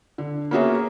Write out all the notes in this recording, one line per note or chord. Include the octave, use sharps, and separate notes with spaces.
D3
A#3 B3 C#4 F#4 G#4 E5